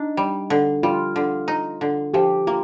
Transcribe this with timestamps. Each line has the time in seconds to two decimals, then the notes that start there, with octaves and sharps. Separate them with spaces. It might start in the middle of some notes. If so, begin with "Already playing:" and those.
Already playing: D4 D#4
0.17 G3
0.50 D3
0.83 G3 F4
1.16 D3
1.48 D#4
1.81 D3
2.14 F3 G4
2.47 A#3 F4